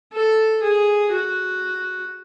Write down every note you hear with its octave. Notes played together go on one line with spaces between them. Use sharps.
A4
G#4
F#4